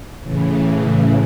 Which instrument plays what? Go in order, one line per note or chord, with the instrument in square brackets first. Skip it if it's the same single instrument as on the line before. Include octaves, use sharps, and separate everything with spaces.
[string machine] A2 C#3 E3